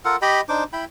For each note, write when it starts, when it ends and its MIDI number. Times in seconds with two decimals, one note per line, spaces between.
0.05 0.16 65
0.05 0.16 69
0.05 0.16 70
0.05 0.16 78
0.22 0.41 67
0.22 0.41 75
0.22 0.41 79
0.22 0.41 83
0.49 0.64 62
0.49 0.64 63
0.49 0.64 72
0.49 0.64 86
0.73 0.85 64
0.73 0.85 79
0.73 0.85 83